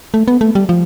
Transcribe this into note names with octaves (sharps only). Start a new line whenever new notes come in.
A3
B3
A3
G3
F3